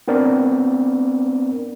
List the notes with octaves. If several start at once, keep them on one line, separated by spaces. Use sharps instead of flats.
B3 C4 D4 A#4 D5